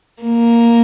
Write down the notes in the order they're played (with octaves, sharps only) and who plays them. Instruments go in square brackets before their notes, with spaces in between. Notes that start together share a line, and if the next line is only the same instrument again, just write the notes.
[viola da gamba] A#3